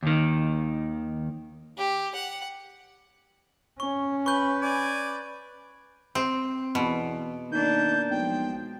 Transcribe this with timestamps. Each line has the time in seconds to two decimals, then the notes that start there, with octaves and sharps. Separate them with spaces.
0.03 D#2 D#3
1.78 G4
2.15 F#5
3.80 C#4 C#6
4.26 B4 B5 C#6 G6
4.62 D5 G#5
6.15 C4
6.75 E2 B2
7.52 D#3 A#3 D4 G6
8.10 B1 F3 G#3 G5